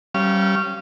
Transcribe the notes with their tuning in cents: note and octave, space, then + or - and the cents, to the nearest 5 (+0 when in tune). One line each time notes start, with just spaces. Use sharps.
G3 -25 C#4 +0 F5 -25